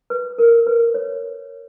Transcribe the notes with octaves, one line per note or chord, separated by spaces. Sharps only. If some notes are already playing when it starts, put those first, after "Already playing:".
B4
A#4
B4
C#5